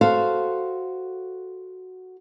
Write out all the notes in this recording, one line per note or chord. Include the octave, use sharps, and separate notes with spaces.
F#4 A4 C5 F5